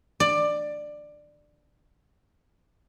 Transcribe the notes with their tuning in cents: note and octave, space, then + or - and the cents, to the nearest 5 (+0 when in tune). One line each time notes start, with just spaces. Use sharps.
D5 +15